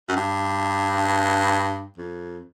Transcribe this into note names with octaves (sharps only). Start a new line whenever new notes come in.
F#2
G2
F2